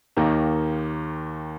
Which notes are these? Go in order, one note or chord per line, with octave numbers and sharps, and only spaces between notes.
D#2 D#3 A#3 D#4